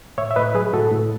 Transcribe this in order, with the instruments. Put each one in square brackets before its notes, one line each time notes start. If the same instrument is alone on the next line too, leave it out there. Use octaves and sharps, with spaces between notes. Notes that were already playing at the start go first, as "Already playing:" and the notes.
[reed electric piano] A2 C#5 E5
E5
A2 B4 D#5
F#3 G#4 B4
A2 F#4 A4
A2